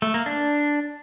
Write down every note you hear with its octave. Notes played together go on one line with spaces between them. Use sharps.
A3
A#3
D4